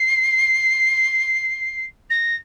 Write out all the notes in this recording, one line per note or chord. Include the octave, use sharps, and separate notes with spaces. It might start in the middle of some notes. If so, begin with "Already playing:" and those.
Already playing: C7
A#6